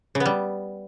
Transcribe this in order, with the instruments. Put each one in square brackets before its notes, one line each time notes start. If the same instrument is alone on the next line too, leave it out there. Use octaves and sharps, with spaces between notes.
[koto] C#3
B3
G3